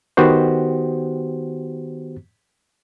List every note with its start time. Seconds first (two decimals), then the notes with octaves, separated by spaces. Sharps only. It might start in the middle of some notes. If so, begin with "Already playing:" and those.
0.17 D#3 B3 F#4 G4 C5